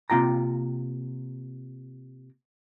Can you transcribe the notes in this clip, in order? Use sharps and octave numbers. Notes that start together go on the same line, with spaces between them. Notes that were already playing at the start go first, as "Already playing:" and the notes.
C3 A#3 F4 G5 A#5